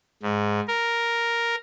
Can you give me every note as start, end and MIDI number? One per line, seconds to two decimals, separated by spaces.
0.23 0.60 44
0.68 1.55 70